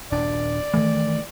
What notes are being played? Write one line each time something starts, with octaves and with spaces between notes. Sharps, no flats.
D#1 D4 D5
D#3 E3 A3